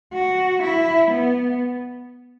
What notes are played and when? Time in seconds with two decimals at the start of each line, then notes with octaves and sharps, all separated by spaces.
0.13 F#4
0.62 E4
1.10 B3